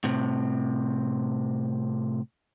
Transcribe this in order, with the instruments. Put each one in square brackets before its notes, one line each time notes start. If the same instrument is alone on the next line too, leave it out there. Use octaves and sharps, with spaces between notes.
[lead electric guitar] A2 C3